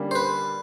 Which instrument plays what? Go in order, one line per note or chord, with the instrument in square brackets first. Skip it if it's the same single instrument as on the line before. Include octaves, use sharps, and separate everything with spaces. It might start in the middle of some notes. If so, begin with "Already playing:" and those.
Already playing: [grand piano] D3 G3 A#3 C#4
[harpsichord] C5
B4